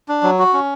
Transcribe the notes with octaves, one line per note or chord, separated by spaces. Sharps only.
D4
F#3
F#4
C#4